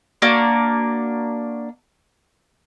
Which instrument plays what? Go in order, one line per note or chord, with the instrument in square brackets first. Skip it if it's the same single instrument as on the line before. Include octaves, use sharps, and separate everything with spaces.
[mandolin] A#3 D4 F#4